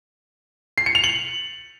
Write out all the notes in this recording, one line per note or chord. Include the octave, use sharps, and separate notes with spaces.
C7
C#7
F7
F#7